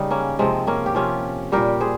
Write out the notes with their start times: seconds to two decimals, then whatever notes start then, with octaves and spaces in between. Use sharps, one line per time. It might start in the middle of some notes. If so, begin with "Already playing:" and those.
Already playing: C#3 G3 D#4
0.11 A#3 C#4
0.39 C3 F3 G#3 C4
0.67 A#3 C#4
0.86 G4
0.95 C3 F3 C#4 F4
1.52 A#2 G3 G4 A#4
1.80 G#4 C5